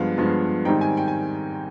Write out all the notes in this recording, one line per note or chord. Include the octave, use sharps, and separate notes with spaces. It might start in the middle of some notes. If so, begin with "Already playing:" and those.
Already playing: G2 F3 G#3 B3 F5
G2 F3 G#3 B3
G#2 D#3 G3 C4 D#4 G5
G#5
G5
G#5